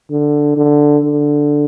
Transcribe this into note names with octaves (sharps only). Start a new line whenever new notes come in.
D3
D3
D3